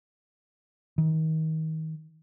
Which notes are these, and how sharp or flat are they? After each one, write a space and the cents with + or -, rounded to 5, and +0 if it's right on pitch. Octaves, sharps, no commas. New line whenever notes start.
D#3 +30